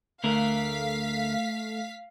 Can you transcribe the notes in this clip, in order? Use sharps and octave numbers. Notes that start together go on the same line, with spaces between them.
D2 D3 A3 A#4 F5 B6